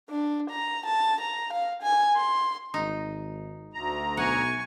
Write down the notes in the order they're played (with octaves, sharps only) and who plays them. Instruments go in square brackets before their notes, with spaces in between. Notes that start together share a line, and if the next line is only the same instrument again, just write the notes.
[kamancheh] D4
A#5
A5
A#5
F5
G#5
C6
[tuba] G#1 [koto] D#4
[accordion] D2 A#5
[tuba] B1 [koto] F#5 [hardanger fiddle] G#5 C#6